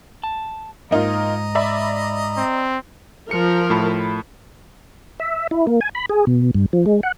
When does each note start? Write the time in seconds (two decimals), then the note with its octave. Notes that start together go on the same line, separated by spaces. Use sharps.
0.24 A5
0.91 F2 G#2 A#3 D#4 F4 D#5 A#5
1.55 D5 E5 B5
2.38 C4
3.31 F3 A#4 F6 C#7
3.70 A2 A5 B5
5.20 E5
5.51 E4
5.67 A#3
5.81 G#5
5.95 B5
6.10 G#4
6.27 B2
6.55 G2
6.73 F3
6.86 G#3
7.03 F#5